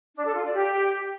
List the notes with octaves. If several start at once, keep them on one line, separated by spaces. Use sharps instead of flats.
D4
A4
F4
D5
G4